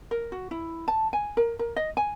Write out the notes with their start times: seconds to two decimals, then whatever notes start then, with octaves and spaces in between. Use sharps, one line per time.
0.11 A#4
0.32 F#4
0.51 E4
0.88 A5
1.13 G#5
1.37 A#4
1.59 A#4
1.76 D#5
1.97 G#5